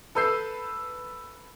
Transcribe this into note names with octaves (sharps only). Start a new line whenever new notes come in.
A4 B4 E6 G6 C7